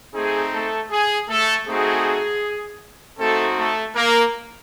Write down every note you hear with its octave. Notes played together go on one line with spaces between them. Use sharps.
A3 C4 D#4 G#4
A3 A4
G#4
A3 A4
A3 C4 D#4 F#4 G#4
A3 C4 D#4 F#4 A4
A3 A4
A#3 A#4